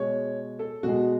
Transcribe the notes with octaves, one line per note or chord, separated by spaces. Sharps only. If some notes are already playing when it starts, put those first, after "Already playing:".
Already playing: B2 G#3 C#5
A4
B2 G#3 F#4